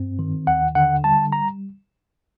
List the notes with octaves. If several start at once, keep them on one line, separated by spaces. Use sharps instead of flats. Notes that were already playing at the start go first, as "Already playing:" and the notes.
Already playing: G2 C4
D#3
D#2 F#5
D3 F#5
G3 A5
A#5